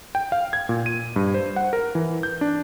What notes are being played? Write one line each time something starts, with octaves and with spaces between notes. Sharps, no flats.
G5
F5
G#6
A#2
D#7
G2
C5
F#5
A#4
E3
G6
D4